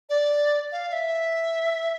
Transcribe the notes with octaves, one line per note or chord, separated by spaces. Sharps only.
D5
F5
F5
E5